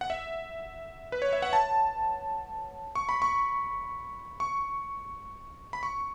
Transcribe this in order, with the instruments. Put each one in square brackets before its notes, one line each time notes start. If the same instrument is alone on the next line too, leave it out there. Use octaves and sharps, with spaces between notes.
[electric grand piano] F#5
E5
B4
C#5
E5
F#5
A5
C#6
B5
C#6
C#6
B5
C#6